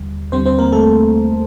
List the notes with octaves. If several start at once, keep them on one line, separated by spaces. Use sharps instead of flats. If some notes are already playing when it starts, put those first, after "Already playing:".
Already playing: D#2 D3 G3
D#2 D3 G3 C4 C5
C4 C5
A#3 A#4
A3 A4